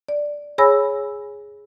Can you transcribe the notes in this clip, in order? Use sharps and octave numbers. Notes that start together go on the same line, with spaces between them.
D5
G#4 C#5 G#5 B5 E6 A#6